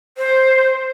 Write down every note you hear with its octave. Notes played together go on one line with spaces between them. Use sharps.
C5